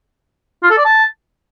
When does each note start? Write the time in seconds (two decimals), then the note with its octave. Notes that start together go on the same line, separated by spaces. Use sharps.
0.63 F4
0.70 A4
0.78 D5
0.85 A5